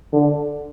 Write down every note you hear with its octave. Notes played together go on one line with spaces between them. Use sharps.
D3